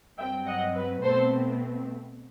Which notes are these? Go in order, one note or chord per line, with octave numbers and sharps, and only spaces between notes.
G2 F#3 C4 E5 G5
D#5 F#5
B4
B2 A3 C4 A4 C5